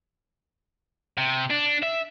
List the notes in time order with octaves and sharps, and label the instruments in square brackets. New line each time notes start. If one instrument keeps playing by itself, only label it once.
[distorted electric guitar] C3
D4
E5